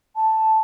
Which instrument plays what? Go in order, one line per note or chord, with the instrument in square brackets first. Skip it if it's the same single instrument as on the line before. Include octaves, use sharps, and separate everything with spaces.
[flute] A5